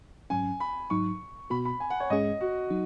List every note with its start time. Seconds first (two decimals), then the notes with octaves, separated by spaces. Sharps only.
0.30 G#2 F#3 C#4 G#5
0.60 B5
0.90 G#2 F#3 D#4 C#6
1.50 B2 B3 F#4 B5
1.65 B5
1.80 G#5
1.90 F#5
2.00 C#5
2.10 G#2 G#3 C#4 G#4 D#5
2.41 F#4
2.70 F#3 D#4